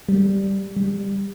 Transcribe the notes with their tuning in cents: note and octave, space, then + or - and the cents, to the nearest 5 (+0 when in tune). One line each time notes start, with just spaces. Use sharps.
G3 +0
G3 +20